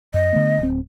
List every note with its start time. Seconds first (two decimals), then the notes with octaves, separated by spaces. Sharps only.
0.14 F#2 D#5
0.33 D3 A3 B3
0.59 D1 C4